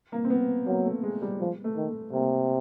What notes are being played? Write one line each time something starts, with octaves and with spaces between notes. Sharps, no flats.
A#3
C4
B3
F#3 A#3
A3
G#3
G3
F3 G#3
A3
D#3
A3
C3 A#3